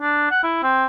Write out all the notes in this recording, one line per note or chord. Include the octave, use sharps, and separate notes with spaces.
D4
F#5
E4
C4